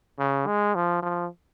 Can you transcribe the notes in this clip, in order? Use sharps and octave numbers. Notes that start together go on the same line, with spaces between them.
C#3
G#3
F3
F3